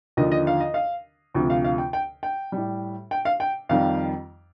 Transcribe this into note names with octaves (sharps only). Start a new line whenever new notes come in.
D#2 D3 F3 D#5
D#5
F5
D#5
F5
D2 C3 F3
F5
F5
G5
G5
G5
A2 G3
G5
F5
G5
F2 D#3 G3 F5